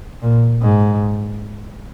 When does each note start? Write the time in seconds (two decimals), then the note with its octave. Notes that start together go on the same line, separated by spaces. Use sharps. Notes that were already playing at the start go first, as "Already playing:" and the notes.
0.22 A#2
0.62 G#2